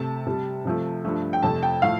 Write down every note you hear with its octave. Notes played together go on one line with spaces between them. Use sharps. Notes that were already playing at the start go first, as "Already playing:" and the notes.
Already playing: C3 A3 A5
C3 G3
C3 F3 A3
G2 F3 A3
G5
F2 C3 A3 A5
G5
A2 F3 A3 F5